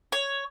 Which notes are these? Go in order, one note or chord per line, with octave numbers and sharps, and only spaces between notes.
C#5